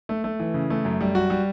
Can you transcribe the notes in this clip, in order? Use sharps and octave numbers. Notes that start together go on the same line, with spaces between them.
A3
A3
E3
C#3
A3
F#2
G3
F#4
G3